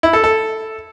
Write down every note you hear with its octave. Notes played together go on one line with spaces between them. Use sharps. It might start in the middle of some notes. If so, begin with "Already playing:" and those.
E4
A4
A4